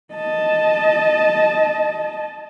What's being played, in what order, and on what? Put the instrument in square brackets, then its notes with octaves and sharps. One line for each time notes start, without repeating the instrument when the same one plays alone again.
[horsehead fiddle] D#5 A5